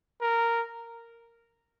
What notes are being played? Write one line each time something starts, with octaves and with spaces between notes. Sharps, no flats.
A#4